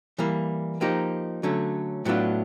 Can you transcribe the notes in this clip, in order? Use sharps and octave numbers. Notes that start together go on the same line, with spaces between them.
E3 G3 A#3
F3 A#3 D#4 G4
D3 F#3 A3 C#4
A2 F#3 B3 D4 F4